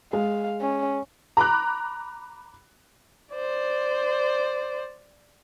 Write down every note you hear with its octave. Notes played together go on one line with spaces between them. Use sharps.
G#3 F5
C#4
A#5 B5 D6 F#6
C5 D5